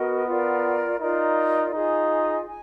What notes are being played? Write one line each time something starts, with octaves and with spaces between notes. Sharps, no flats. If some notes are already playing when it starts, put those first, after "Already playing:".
Already playing: B3 F#4 A#4 D#5
F4 A#4 D5
D#4 F4 A#4 D5
D#4 F4 G#4 D#5 G#5
G#5